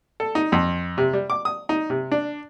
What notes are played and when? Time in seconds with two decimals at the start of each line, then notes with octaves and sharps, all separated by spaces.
0.20 A4
0.35 D#4
0.52 F2
0.98 C3
1.13 G3
1.30 D6
1.45 D#6
1.69 D#4
1.90 C3
2.12 D4